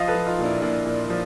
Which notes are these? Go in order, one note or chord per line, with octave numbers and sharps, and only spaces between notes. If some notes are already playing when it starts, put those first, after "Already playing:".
Already playing: F3 D#5 F5
A4 B4
F3
D#4 F4
A#2
D4 E4
A#2 D4 E4
A#2
F3